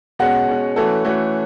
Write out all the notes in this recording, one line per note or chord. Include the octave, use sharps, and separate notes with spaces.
B2 G#3 C#4 F#5
B2 G#3 C#4
E3 A3 C#4 F#4 A4
E3 A3 C#4 F#4